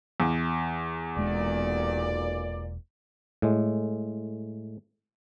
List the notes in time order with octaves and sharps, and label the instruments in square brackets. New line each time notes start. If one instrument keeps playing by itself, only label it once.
[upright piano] E2
[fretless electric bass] E1 G#3 D4 [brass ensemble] B1 A#2 D5
[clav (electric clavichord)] A2 G#3